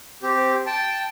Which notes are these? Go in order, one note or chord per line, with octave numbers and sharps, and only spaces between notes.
C4 G4
G5 A5